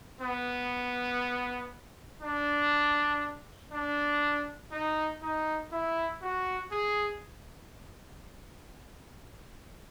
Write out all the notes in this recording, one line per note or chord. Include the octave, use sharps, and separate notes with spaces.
B3
D4
D4
D#4
D#4
E4
F#4
G#4